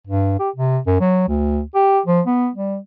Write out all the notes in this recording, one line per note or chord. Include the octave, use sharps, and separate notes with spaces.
G2
G4
C3
F#2
F#3
D2
G4
F3
B3
G3